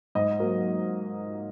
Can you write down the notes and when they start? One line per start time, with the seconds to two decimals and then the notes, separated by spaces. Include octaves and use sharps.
0.15 G#2 D#5
0.40 F#3 A#3